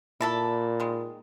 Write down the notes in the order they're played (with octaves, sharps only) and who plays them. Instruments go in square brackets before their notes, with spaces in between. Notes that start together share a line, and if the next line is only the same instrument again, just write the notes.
[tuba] A#2 [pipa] E4 A4 [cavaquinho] D5 A5 B5
[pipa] D#3 G#3